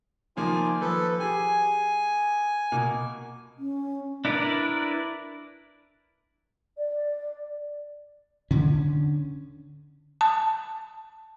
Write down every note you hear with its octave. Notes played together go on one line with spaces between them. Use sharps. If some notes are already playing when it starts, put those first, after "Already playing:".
D#3 F3 A#3 F4 G#5
F3 A4 B4
G4 G#4 G#5
B2 A#3
C#4
D4 E4 A#4 B4 D5
D5
D3 C#4
A5